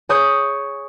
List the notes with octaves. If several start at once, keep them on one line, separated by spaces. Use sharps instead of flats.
G#4 C#5 C#6 D#6 G6